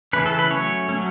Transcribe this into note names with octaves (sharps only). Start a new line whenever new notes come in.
C#3 E3 A3 C#4 B4
A4
B4
F#3 A3 C#4 C#5
F#3 A3 C#4